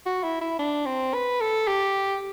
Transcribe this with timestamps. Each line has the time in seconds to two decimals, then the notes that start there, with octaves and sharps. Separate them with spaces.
0.06 F#4
0.24 E4
0.41 E4
0.59 D4
0.86 C4
1.14 B4
1.41 A4
1.67 G4